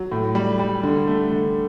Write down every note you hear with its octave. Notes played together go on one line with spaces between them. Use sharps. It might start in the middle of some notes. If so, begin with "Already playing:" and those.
Already playing: F#3
A2
G3
G3
D3
A3
D3